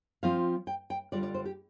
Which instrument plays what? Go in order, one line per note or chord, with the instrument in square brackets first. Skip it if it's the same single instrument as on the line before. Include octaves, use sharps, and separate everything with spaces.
[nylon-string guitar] F3 C4 F4 F5
G5
G5
D3 G3 F4 D5
D5
C5
G4